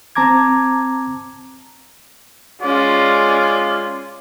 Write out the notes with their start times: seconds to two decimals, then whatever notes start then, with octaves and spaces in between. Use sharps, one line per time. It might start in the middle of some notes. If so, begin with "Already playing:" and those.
0.15 C4 A5 A#5 D6 G#6
2.62 G#3 C#4 F4 D5